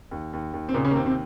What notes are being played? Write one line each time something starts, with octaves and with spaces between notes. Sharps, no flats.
D#2
D#2
D#2
C4
A#2 C#3 A#3
C#3 C#4
A#3
D#2 C3 C4
C3 C4